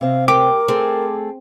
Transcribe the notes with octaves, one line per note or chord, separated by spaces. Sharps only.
C3 C4 F5
G4 A#4 D6
A3 C4 G#4 A4